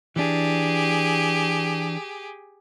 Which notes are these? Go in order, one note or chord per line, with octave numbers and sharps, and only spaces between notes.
E3 D4 G4 G#4